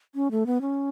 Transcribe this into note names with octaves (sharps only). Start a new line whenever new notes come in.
C#4
A3
B3
C#4